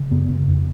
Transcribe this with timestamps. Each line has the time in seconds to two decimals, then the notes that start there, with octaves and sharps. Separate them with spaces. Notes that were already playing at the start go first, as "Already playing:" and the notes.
Already playing: C#3
0.11 F#2 B3
0.30 C#3
0.48 F2